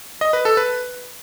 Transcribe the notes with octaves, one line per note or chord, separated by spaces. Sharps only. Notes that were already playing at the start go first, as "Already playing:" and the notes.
D#5
B4
A4
B4